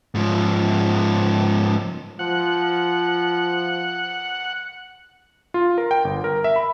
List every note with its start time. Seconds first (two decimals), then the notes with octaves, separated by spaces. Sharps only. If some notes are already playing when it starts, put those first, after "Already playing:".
0.15 G#2 F3
2.19 F3 F#5
5.54 F4
5.78 A#4
5.91 G5
6.04 G1
6.24 A#4
6.44 E5
6.56 B5